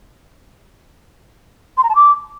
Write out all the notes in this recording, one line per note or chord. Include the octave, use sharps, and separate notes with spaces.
C6
A#5
A5
D6